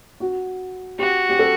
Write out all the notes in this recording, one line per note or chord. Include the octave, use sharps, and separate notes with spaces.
F#4
F#4 G4
G4
A4